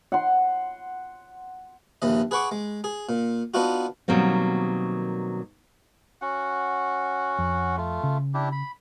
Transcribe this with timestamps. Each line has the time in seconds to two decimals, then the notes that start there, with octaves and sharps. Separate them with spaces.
0.12 F#5 C6
2.02 A#1 D#2 E3 D#5
2.31 G#4 B4 F#5 C#6 D6
2.51 G#3
2.84 G#4
3.09 A#2
3.54 B3 D4 D#4 F4 F#4
4.08 B2 D#3 F#3 G3 A#3 C4
6.21 C#4 F#4 F#5
7.39 F2
7.77 A3 F4
8.04 C#3
8.34 D4 E4 G4
8.52 B5